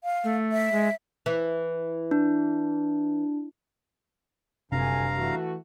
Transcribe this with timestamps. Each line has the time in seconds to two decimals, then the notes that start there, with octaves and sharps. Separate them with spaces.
0.04 F5
0.24 A3
0.52 E5
0.72 G#3
1.26 E3
2.11 D4
4.72 F#1 D2 G2 C3 D4 F5 G#5 A#5
5.16 E3 A3 F#4